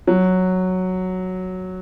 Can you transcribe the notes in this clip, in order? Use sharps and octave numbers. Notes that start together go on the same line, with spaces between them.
F#3